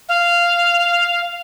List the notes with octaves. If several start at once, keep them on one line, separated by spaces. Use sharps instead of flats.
F5